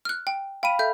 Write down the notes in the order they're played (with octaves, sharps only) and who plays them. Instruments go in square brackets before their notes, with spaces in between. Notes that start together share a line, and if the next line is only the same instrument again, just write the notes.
[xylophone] F6 F#6
G5
[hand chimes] F5 B5 [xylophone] G5 D#7
[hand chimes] A4 [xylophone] E5 G6